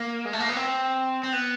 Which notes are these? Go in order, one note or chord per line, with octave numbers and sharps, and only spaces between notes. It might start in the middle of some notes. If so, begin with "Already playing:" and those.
Already playing: A#3
G#3
A3
A#3
B3
C4
C4
B3